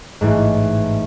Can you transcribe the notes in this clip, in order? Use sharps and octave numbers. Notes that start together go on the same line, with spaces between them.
A1 G#2